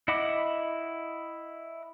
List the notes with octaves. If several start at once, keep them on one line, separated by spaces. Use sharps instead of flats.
E4 D#5 F#5 B5 D6